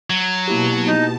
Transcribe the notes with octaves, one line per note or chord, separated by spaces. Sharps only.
F#3
B2 A#3 E4 G4 A5
D#4